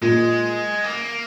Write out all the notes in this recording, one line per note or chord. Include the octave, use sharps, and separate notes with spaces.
A#2 G#3
A#3